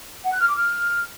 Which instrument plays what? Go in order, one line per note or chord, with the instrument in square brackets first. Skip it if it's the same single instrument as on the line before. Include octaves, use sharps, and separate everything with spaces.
[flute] F#5
F#6
F6
D6
F6